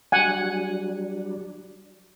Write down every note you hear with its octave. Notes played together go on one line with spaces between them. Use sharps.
F#3 G3 D4 F#5 G#5